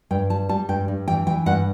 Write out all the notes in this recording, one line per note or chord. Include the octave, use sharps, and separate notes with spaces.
G2 G5
G3 A5
G3 A5
G2 G5
G2
E3 G5
E3 G5
G2 F#5